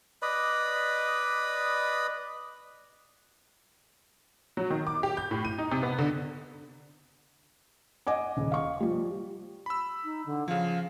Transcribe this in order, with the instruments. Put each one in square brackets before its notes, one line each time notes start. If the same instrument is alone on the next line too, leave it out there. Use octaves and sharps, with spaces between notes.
[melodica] B4 D5 D#5 B5
[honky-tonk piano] F#3
D#3
D6
G4
G6
A2
D#7
D#4
C3
B3
D3
[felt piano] D#5 F#5 G#5 D6
D#1 C#3
F5 C#6
F3 G3
[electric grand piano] B5 E6
[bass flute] D#4
D3
[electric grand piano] C#3 F3 [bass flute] F5